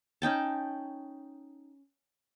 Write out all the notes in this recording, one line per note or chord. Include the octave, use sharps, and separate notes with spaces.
C#4 D#4 G5 A5